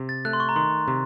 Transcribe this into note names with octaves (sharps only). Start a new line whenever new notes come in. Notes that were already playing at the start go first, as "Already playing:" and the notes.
Already playing: C3
A6
A3 F#6
C6
C#6
A#5
D#3 C6
C3